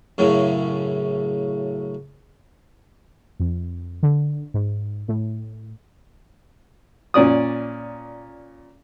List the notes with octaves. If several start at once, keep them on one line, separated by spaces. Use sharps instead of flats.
F#2 A2 C#3
F2
D3
G#2
A2
A#2 C#4 D5 D#6